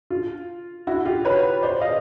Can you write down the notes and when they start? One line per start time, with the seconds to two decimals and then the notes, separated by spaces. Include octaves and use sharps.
0.10 F4
0.87 E4 F#4
1.05 F4 G4
1.25 B4 C#5
1.63 C5 D5
1.81 D#5 F5